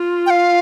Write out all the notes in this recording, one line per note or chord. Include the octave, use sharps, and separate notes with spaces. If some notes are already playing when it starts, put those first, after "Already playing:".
Already playing: F4
G5
F5